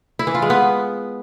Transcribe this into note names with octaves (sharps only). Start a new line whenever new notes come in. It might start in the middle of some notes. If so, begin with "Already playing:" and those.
E4
E3
F4
G#3
B3